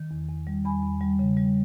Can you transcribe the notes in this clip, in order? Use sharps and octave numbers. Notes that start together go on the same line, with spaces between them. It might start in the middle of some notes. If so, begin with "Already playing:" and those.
Already playing: D#3
E2
E2
G3
E2 G#5 B5
E2
G3
C#3
G3